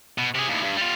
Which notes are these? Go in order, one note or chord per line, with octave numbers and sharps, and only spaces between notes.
B2
C3 G#4
D#2 A2
G2
G3 F4